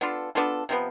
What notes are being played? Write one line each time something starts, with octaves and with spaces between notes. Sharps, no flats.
B3 D4 F4 A4
B3 D4 F4 A4
C3 F3 B3